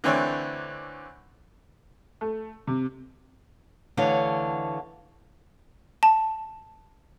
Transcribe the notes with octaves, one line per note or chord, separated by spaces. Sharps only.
D3 E3 A3 C4 D4 C#5
A3
C3
D2 D3 E3 C#5 F5
A5